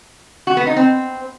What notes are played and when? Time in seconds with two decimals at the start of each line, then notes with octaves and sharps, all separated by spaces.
0.47 F#4
0.57 B3
0.67 D#4
0.76 C4